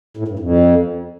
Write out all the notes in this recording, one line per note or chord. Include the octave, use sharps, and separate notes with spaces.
A2
G2
F2